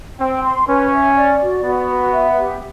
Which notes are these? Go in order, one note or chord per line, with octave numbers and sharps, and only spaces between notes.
C4 G5
C6
C#4 B4
E5
D5
F#4
B3 F#4
B4
E5
G4